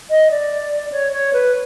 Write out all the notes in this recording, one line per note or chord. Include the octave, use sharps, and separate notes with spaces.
D#5
D5
C#5
C#5
B4